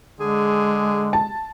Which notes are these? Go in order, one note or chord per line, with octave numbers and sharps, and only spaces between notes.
D3 G#3 G#4
A5